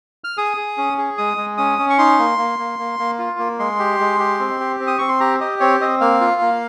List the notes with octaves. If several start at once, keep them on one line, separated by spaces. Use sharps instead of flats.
F6
G#4 D#6
G#4
C#4
G#4
G#3 D#6
G#3
C#4 D#6
C#4
C#6
D#4 C6
A#3
A#3
A#3
A#3
A#3
F4
A#3
G#3 C6
G4
G#3
G4
C4
G4
C4
D#6
C4 C#6
C6
G4 A#5
G4 D#5
C4 C#5
C4 D#5
A#3 F5
F4
A#3